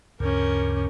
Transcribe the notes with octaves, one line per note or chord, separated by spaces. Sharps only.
D2 G2 C#3 C#4 A#4